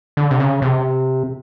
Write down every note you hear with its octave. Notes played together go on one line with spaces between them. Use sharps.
D3
C3
C#3
C3